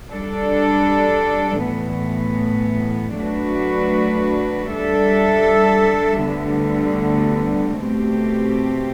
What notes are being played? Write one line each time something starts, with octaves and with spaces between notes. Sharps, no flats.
G3 D4 A4
A2 E3 B3
F#3 A3 D4 F#4 B4
G3 D4 A4 E5
D2 D3 G3 B3
B2 A3 C4 G4